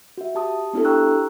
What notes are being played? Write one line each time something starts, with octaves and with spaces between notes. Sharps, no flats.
F#4 E5
G4 A5 D#6
B3 D4 E4 G4 A4
G5 A#5 C#6 E6 F#6